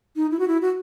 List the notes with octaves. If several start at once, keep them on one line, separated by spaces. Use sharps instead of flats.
D#4
E4
F#4
E4
F#4